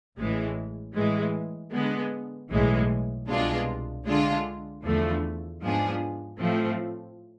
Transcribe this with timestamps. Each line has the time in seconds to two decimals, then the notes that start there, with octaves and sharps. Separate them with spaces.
0.18 A1 A2 E3 G#3
0.95 A2 E3 G#3
1.72 D3 G#3 B3
2.50 B1 A2 E3 G#3
3.28 C2 B2 G#3 D4 F4
4.06 D3 G#3 D4 F4
4.83 E2 D3 F3 A3
5.62 G#2 F3 B3 D4 G#4
6.39 A2 F3 A3 C4